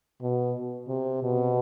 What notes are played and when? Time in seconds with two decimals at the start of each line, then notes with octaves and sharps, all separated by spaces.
0.22 B2
0.88 C3
1.23 B2